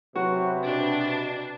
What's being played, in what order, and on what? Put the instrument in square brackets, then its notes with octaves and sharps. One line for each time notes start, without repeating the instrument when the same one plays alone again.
[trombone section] C3 B4 [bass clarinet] F#3 [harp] F#4
[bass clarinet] B2 [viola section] D4